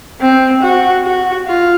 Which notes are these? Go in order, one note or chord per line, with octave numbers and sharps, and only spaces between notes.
C4
F#4
F#4
F4